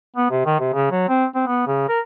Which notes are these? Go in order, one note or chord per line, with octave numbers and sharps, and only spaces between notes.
B3
C3
D#3
C3
C#3
F#3
C4
C4
B3
C#3
A#4